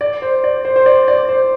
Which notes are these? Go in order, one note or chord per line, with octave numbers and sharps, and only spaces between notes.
D5
C5
D5
C5
C5
D5
D5
C5